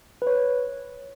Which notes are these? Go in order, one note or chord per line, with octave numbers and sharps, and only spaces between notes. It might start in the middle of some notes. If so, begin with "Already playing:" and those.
B4
C#5